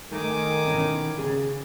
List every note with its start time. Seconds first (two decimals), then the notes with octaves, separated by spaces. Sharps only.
0.11 D#3 A3 G#5 D6 D#6
0.66 B2 E3 C#4
1.18 C#3 G#4